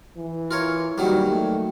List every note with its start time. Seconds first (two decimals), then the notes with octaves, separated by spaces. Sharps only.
0.18 E3
0.51 F4 A#4 C#5
0.98 D#3 F#3 G3 A#3
1.28 A3